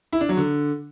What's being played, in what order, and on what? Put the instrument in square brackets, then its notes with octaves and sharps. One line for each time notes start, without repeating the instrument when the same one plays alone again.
[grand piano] E4
D4
F#3
D3